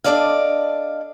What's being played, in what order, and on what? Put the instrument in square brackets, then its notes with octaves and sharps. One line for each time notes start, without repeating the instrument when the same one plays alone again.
[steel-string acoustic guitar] D4 D#4 A4 D5 D#5 F5